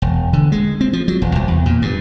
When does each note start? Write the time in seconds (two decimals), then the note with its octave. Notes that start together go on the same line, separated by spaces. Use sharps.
0.02 E1
0.33 D3
0.52 G#3
0.81 C4
0.93 F3
1.08 F#3
1.22 E1
1.35 C2
1.48 E2
1.66 A#2
1.82 G2